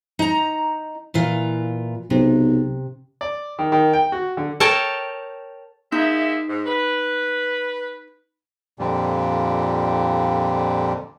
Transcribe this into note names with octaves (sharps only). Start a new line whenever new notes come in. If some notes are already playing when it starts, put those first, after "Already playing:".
D#4 A#5
A#2 E3 F4
B1 C3
D5
D#3
D#3
G5
F#4
D3
A4 A#4 C#5 G5 A5
G#3 A#3 D#4 E5
G#2
B4
F2 A#2 D3 G3